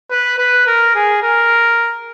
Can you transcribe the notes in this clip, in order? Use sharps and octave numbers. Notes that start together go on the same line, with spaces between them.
B4
B4
A#4
G#4
A#4